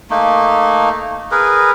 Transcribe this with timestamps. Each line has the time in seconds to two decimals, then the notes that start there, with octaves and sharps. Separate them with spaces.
0.10 A3 A#3 D#4
1.31 G#4 A#4 B4